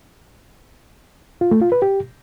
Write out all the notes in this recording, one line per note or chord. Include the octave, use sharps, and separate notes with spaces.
F4
A3
F4
B4
G4